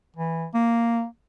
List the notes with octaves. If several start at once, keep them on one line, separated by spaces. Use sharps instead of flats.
E3
A#3